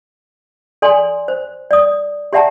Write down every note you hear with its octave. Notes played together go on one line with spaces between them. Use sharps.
A4 D5 G#5 C6
C5
D5 D#6
G4 D5 E5 F#5 A5 A#5